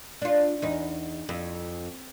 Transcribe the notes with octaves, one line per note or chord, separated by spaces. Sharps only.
D4 F4
E2 D#4
F2